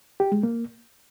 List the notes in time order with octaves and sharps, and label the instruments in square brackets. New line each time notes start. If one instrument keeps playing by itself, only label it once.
[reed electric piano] G4
G#3
A#3